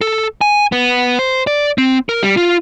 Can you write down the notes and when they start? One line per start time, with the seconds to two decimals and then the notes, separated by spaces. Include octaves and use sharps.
0.01 A4
0.41 G#5
0.72 B3
1.19 C5
1.47 D5
1.78 C4
2.09 A#4
2.23 G3
2.37 F4